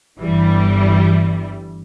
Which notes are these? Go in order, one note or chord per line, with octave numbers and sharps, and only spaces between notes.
G1 E3 G3